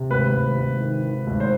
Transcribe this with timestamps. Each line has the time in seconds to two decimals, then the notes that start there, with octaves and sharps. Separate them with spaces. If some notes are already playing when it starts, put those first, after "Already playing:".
Already playing: C3
0.10 G#1 B4
0.33 G#1
0.56 G#1
0.80 D#3
1.03 D#3
1.27 G#1
1.40 C5